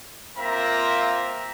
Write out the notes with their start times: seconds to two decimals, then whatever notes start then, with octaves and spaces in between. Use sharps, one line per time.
0.38 A#3 C4 F4 E5 A#5